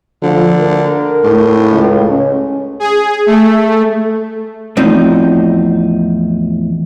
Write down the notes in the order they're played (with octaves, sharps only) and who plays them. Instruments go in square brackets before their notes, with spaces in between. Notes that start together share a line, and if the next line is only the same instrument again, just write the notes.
[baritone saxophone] D3 [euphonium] F3
[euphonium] A#4
[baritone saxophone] A2
[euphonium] C#2
C#4
[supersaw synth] G#4
A3
[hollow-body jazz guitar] E2 A2 F3 C4 D#4